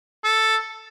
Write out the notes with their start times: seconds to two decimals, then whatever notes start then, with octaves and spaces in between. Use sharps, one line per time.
0.24 A4